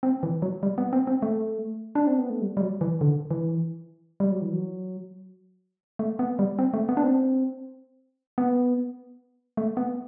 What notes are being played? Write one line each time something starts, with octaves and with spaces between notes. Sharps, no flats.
C4
E3
F#3
G3
B3
C4
C4
A3
D4
C4
B3
A3
G3
G3
F#3
E3
D3
E3
G3
F#3
E3
F#3
A3
B3
G3
C4
A3
B3
D4
C4
B3
A3
B3